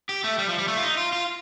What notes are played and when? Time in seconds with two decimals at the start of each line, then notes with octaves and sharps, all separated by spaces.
0.09 G4
0.24 A3
0.38 G3
0.48 F3
0.58 G3
0.68 A3
0.77 F4
0.83 D#4
0.97 F4
1.12 F4